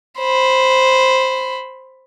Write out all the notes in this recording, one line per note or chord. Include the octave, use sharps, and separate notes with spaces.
C5 B5